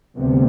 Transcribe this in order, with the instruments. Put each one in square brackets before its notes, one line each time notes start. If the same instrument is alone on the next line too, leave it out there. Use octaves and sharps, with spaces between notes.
[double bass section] D2 C3 G3 B3